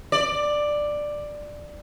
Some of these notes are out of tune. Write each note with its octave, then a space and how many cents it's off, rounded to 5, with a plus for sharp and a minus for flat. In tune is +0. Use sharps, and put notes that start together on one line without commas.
D5 +10